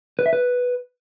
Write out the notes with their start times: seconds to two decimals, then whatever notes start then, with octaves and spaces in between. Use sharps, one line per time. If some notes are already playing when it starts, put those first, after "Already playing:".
0.19 B4
0.26 E5
0.33 B4